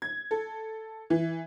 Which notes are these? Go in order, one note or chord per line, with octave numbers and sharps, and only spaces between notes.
G#6
A4
E3